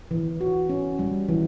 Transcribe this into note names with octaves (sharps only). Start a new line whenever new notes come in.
E3
F#4
C#4
G3
E3